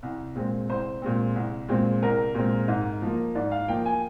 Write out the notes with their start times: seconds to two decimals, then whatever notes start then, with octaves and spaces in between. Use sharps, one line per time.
0.03 C2
0.36 A#2 G#3 C4
0.70 C2 C5
1.02 A#2 G#3 C4
1.35 C2
1.69 A#2 G#3 C4
2.02 C2 A#4
2.35 A#2 G#3 C4
2.68 G#2
3.02 F3 A#3
3.35 G#2 D5
3.51 F5
3.68 F3 A#3 G5
3.86 G#5